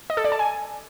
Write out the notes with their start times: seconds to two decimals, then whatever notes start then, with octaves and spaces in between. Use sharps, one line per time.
0.10 D#5
0.17 A4
0.24 D5
0.32 A5
0.39 G#5